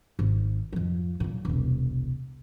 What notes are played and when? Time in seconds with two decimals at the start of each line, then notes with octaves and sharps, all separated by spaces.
0.19 G#1
0.73 F2 F3
1.20 F#2 A#2
1.45 E1 C2